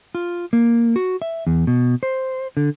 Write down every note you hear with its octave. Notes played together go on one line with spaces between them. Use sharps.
F4
A#3
F#4
E5
E2
B2
C5
D3